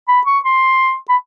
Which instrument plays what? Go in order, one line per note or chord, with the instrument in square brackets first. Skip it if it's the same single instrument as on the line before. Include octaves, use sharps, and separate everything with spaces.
[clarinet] B5
C#6
C6
B5